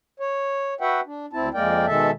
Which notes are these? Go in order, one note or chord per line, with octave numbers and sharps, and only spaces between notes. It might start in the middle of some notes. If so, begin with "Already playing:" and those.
C#5
F#4 B4 E5 F#5 G5
D4
D2 C4 E4 A5
F2 G#3 A#3 A#4 D5 G5
B2 D#3 G#3 A4 E5 A5